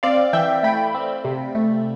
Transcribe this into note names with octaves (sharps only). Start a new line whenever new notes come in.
C4 D5 F5
E3 E5 G5
A3 G5 B5
C4
C3
A3